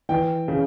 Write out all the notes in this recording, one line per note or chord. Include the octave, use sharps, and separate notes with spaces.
E3 G5
C#3